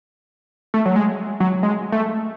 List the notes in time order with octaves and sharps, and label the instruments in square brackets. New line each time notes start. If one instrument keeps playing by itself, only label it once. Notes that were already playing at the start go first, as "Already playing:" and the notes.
[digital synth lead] A3
F#3
G#3
F#3
G#3
A3